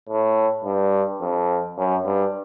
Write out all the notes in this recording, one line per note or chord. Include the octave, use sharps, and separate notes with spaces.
A2
G2
F2
F#2
G2